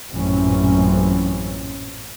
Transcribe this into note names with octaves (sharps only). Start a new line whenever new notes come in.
A1 F#2 A#2 E3 C4 C#4